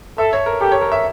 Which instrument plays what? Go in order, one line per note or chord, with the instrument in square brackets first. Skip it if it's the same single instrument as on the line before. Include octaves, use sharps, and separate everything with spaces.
[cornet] A4 [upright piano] E5
[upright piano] C#5
A#4
[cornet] G4 [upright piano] A4
[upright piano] C#5
A#4
E5